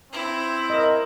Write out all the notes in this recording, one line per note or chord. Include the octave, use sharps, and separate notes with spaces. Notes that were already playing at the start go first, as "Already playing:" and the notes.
C4 E4
A#4 D#5